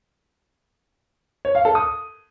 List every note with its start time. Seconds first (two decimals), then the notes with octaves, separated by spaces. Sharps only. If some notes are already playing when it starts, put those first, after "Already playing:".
1.45 C#5
1.55 F5
1.65 A4
1.75 D#6